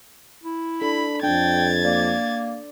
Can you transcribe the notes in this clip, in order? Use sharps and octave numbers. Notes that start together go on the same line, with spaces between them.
E4
D4 A4 B5
F2 D4 G5 G#6 A6
A#3 D5